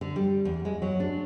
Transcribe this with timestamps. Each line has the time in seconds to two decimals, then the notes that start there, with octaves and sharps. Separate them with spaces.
0.01 D3
0.16 G3
0.45 E2
0.65 G#3
0.82 F#3
1.00 D4